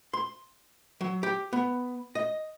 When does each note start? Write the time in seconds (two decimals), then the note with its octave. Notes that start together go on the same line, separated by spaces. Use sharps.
0.13 C6
1.01 F#3
1.23 G4
1.53 B3
2.15 D#5